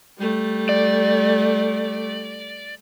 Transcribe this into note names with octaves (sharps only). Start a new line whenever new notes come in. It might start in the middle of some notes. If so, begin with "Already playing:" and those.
G3 A3
D5